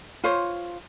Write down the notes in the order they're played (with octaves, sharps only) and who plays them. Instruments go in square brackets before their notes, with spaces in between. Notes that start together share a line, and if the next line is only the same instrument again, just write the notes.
[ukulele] F4 C5 C#5